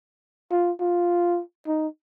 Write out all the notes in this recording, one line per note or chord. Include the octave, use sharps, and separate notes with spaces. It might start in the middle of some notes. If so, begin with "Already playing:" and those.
F4
F4
D#4